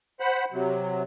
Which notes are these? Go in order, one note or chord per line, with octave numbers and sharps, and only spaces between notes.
C5 F#5 B5
C3 F#3